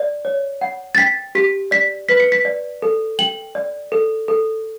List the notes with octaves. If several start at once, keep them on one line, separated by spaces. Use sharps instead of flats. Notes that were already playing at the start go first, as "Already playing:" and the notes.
Already playing: D5
C#5
F#5
A6
G5 B6
G4 B6
D5 B6
B4 B6
C#7
B6
D5
A4
G5 F#7
D5
A4
A4